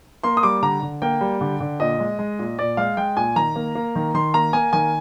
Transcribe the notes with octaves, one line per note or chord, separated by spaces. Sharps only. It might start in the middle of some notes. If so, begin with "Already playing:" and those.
A#3 C6
D#6
G3 D6
D3 A#5
D3
A#3 G5
G3
D3
D3
A#2 D#5
G#3
G#3
A#2
A#2 D5
G#3 F5
G#3 G5
A#2 G#5
D#3 A#5
A#3
A#3
D#3
D#3 C6
A#3 A#5
A#3 G#5
D#3 G#5